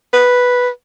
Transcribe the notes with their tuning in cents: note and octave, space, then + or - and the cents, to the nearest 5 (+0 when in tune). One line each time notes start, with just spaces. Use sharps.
B4 -5